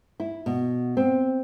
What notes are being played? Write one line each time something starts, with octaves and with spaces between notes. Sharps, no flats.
E4
B2
C4